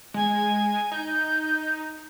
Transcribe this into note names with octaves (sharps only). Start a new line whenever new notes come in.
G#3 G#5
D#4 G6